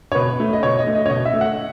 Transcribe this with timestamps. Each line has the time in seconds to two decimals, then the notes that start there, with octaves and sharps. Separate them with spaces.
0.12 C#5
0.15 B2 B4
0.40 A3
0.53 D#5
0.63 B2 C#5
0.79 D#5
0.87 A3
0.95 D#5
1.06 C#5
1.10 B2 D#5
1.26 E5
1.33 A3
1.41 F#5